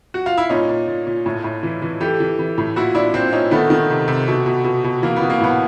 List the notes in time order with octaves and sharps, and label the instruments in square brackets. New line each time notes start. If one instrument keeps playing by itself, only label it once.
[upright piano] F#4
F4
E4
A#2 C#4 D#4
A#2
A#2
A#2
A2
A2
E3
E3
E3 G4 A4
E3
E3
A2
A#2 E4 F#4
A#2 D4 E4
A#2 C4 D4
A#2 C#4 D#4
D#3 A3 B3
D#3
C3
C3
B2
B2
B2
B2
E3 A#3
B3
E3
A#3
A2 B3